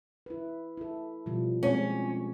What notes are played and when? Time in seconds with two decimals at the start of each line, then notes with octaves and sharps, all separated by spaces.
0.26 E4 B4
0.77 E4 A4
1.26 B2 F3 G3
1.63 G#3 C4 C#4 G4